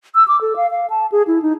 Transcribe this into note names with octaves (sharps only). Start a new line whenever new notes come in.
E6
D6
A4
F5
F5
A5
G#4
E4
D#4